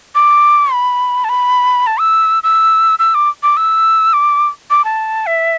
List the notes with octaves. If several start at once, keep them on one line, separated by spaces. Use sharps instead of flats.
D6
B5
A5
B5
A5
E6
E6
E6
D6
D6
E6
D6
D6
A5
E5